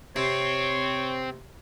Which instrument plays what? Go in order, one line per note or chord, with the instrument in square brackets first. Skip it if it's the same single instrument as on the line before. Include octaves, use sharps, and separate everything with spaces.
[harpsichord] C3 [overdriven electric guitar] C4 [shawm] C#5